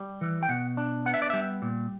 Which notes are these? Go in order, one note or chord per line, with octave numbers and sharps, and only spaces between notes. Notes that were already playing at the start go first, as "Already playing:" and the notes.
Already playing: G3
E3
G5
B2 F#5
D4
B3 F#5
E5
D5
G3 E5
A#2